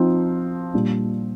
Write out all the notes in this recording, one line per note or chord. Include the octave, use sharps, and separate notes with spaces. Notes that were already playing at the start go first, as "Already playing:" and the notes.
Already playing: F3 C4 D#4
A#2 G3 D4